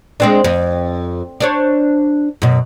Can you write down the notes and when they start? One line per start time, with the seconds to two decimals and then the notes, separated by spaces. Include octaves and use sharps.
0.20 G#3 C4 D4
0.44 F2
1.40 D4 C5 C#5
2.42 F#2 B2